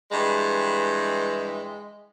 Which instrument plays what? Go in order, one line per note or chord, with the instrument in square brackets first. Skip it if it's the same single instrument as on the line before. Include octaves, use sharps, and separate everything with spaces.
[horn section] G2 E3 G#3